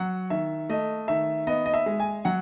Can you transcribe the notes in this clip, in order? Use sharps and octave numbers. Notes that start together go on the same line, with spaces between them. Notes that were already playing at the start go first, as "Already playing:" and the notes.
Already playing: F#3 F#5
D#3 E5
A3 D#5
D#3 E5
B3 D#5
D#5
E5
G#3
G#5
F#3 F#5